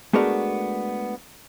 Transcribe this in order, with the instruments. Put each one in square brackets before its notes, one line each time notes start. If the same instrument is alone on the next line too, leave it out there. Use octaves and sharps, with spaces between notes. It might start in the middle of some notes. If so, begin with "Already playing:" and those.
[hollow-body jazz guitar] G#3 A3 B3 D4 F#4 A#4